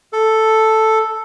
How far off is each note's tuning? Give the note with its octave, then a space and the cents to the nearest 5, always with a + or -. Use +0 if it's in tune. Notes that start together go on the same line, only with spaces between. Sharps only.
A4 +0